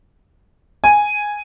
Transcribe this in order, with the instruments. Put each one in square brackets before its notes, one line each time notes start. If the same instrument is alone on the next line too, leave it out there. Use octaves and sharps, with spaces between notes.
[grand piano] G#5